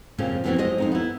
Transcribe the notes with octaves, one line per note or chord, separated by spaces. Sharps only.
F2 A#2 C#3 F3
F2 A2 E3 B3 C4 F#4
F#3 G#3 C5 D#5
F2 D#4 A#4
B3 E4